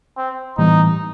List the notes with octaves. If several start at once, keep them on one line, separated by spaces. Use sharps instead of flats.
C4
A2 E3 G3 B3 D#4